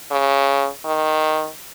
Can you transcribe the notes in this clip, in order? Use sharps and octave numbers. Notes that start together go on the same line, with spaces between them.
C#3
D#3